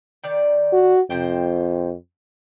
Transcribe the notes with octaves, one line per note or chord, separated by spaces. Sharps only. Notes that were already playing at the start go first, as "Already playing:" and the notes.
D#3 D5
F#4
F2 C3 C5 G5